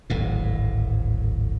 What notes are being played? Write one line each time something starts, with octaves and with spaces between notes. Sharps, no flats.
D1 G#1 A2